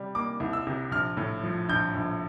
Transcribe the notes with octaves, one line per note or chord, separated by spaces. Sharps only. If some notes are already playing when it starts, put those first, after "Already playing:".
Already playing: C3 G3
A#3 D6
C2
E6
C3
A#1 F6
A2
F3
A#1 G6
A#1